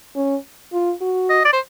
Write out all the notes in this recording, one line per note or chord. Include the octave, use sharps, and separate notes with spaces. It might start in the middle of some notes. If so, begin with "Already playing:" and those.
C#4
F4
F#4
D#5
D5
C5